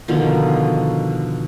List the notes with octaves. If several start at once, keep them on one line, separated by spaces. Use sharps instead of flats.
B2 D3 D#3 F3